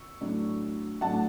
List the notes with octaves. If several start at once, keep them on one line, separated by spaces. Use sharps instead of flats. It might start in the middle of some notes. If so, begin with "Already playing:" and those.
Already playing: C#6 E6
A2 F#3 A3 D4
A2 F#3 A3 D4 F#5 A5